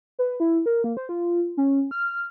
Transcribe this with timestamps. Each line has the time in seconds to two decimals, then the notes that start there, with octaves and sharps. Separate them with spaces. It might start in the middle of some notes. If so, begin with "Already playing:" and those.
0.19 B4
0.40 E4
0.66 A#4
0.84 A#3
0.97 C5
1.09 F4
1.57 C#4
1.91 F6